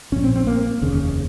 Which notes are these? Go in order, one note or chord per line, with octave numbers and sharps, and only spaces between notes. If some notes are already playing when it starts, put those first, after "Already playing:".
A#1 A#2 C#4
C4
C4
A#3
F1 D#2 C#3